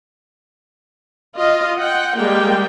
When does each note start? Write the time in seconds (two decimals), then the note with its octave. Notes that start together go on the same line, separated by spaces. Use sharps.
1.37 F4 D#5
1.78 F#5 G5
2.16 G3 G#3 A#3 G5